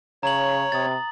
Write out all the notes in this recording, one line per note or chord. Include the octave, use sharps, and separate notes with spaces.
C#3 C#5 A#5 F#7
C3 D#6 A6